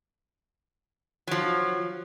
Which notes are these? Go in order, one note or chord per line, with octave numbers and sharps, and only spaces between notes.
F3 F#3